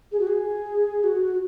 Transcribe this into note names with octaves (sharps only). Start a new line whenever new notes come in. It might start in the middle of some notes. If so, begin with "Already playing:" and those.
G#4
F#4
G#4
F#4